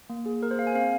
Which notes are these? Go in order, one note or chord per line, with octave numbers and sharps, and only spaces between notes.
A#3
G#4
A#3 A#4
C5
G#4 F5
G#5
C4 F5